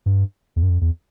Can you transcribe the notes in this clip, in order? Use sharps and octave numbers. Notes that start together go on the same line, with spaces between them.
G2
E2
F#2
F2
E2